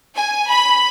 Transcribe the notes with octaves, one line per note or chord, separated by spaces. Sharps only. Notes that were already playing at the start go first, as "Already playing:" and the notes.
G#5
B5